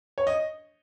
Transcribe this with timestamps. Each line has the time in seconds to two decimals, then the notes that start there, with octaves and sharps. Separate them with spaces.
0.18 C#5
0.27 D#5